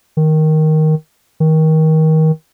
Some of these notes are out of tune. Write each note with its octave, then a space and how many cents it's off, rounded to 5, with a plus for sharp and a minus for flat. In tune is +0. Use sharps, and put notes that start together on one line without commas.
D#3 +5
D#3 +25